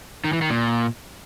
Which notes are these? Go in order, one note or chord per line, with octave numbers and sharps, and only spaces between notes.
D#3
E3
D#3
A#2